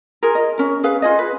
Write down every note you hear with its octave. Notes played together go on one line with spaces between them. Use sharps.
F4 G#4 A#4
D#5
C#4 A#4
G#4 B4 F5
F4 G#4 D#5
B4